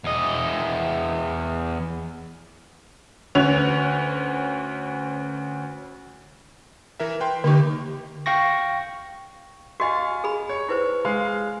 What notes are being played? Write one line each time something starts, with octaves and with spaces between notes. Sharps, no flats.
E2 D#5
D2 C#4 B4 C#5 F7
E3 A#4 E5
B4 G5 C6
D3 A#3 D#4 G4 C#6
F5 G5 C#6 A#6
F#4 D#5 F5 G#5 C#6
G#4 B5
C#5
E4 B4 C5
G#3 F5